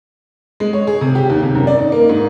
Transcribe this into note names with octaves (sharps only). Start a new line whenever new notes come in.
G#3
C#5
G#4
C3
G4
D#2
C3
F#2
D5
D#4
A#3
G#2